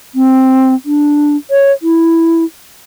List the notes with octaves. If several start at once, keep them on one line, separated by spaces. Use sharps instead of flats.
C4
D4
C#5
E4